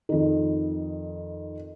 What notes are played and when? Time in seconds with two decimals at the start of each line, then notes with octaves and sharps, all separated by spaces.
0.09 F2 D#3